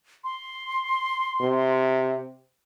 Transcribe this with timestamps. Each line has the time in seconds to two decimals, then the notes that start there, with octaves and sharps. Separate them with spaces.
0.24 C6
1.40 C3